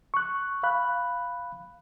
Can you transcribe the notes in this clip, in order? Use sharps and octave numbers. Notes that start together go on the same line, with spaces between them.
C#6 F#6
F5 B5 F#6